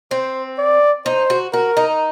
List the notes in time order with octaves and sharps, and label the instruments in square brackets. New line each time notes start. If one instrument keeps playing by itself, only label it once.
[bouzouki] C4 [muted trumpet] C5
[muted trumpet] D5
[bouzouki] D#4 [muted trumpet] C5
[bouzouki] F#4
[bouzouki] F#4 [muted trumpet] A#4
[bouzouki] D#4